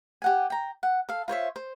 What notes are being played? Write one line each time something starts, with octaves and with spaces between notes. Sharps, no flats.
G4 F#5 G#5
G5 A#5
F#5
A4 F5
F4 C5 C#5 E5
C5